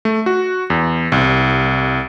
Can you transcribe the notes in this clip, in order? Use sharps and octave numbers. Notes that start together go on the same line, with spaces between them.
A3
F#4
E2
C2